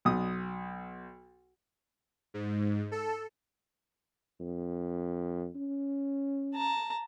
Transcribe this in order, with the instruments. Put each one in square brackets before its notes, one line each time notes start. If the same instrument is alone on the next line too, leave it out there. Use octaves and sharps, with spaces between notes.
[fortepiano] B1 D#6
[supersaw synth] G#2
A4
[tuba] F2
C#4
[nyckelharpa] A5 A#5